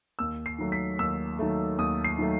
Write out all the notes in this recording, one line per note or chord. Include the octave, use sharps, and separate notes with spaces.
D#2 E6
C7
D#3 F#3 A3
B6
D#2 E6
D#3 F#3 A3
D#2 D#6
C7
D#3 F#3 A3